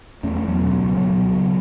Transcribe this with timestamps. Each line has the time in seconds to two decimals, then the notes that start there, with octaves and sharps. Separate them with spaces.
0.23 E2 A3 C#4
0.36 A3 C#4
0.42 E2
0.48 F#3 B3
0.61 B2
0.79 C#2
0.97 B2 F#3 B3
1.16 B2
1.33 C#3